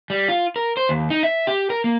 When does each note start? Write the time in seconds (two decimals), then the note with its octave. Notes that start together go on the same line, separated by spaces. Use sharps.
0.10 G3
0.28 F4
0.56 A#4
0.77 C5
0.89 D#2
1.10 D#4
1.23 E5
1.47 G4
1.70 A#4
1.84 A#3